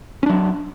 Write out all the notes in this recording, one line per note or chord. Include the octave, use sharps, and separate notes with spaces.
F#3 C#4 D4